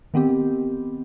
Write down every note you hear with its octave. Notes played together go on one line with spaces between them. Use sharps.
D#3 B3 C4 G4